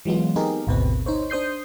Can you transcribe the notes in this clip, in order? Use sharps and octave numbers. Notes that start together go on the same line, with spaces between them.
E3 F#3 G#3 B3 F4
B3 C4 D#4 G4 G#4 A#4
G#1 D2 B2 C4 B4
D#4 C5 C#5
D4 C5 D#6 G6 C7